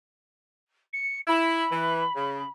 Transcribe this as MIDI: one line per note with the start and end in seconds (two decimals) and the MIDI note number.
0.93 1.19 97
1.28 1.65 64
1.28 2.51 83
1.71 2.04 52
2.16 2.43 49